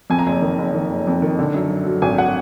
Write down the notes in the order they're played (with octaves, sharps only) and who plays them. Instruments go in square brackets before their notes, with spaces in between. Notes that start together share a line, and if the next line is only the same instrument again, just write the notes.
[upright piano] F2 G#5
A#5
F#1 G#5
D#3
F#1
D#3
F#1
F2
D#3
D3
F#2
F#3
F#3
G#1 G#5
F#5